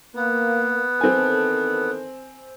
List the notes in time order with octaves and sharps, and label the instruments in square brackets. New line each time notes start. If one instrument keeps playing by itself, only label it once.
[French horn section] A#3 [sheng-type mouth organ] B3
[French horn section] D#3 E3 A4 [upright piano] C4 G#5